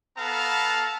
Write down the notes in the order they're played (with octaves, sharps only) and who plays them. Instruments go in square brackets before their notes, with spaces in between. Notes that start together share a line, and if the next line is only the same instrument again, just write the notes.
[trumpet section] B3 A4 F5 A5 A#5